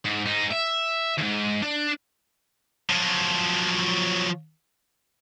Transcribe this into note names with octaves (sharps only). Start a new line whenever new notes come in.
G#2
G#2 D#4
E5
D#2 G#2
D4
F3 F#3